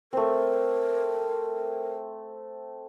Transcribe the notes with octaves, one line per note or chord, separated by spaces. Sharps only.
A3 C4 A#4